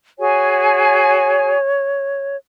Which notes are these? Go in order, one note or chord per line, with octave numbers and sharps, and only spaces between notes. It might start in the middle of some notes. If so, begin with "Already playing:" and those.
F#4 G#4 C#5 G#5